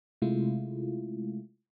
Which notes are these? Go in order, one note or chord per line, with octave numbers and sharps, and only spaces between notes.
C3 G#3 A3 E4 F4